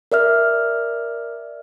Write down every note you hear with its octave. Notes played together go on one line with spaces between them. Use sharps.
A#4 D5 E5 F6